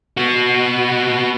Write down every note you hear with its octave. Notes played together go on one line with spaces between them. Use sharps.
B3 F#4